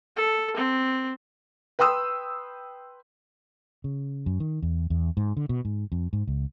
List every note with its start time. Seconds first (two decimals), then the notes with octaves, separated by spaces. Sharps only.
0.16 A4
0.57 C4
1.79 B4 G5 C6 D#6 E6
3.84 C#3
4.26 F#2
4.40 D#3
4.62 E2
4.90 E2
5.17 G#2
5.37 D3
5.49 B2
5.65 G#2
5.92 F2
6.13 G#2
6.27 C#2